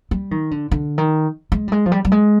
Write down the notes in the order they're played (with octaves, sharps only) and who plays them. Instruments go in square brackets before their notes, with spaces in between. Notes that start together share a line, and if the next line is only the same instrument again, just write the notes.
[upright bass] G3
D#3
D3
D3
D#3
G#3
G3
G#3
F3
G3
G3
G#3